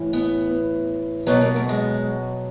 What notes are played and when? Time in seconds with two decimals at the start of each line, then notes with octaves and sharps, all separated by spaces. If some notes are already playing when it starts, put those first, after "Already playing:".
Already playing: A2 E3
0.13 B3
1.27 B2 F#3 B3
1.41 A#3
1.56 A3
1.69 G#3